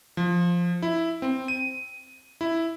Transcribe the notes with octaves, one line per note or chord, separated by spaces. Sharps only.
F3
E4
C4
D#7
E4